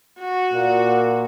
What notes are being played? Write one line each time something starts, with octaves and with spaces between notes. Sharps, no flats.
F#4
A#2